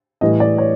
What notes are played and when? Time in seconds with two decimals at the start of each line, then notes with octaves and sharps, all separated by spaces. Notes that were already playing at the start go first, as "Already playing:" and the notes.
0.21 A2 E3 G3 D#5
0.40 D5
0.58 C#5